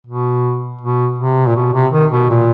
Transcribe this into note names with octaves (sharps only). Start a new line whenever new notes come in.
B2
B2
C3
A#2
B2
C3
D#3
B2
A#2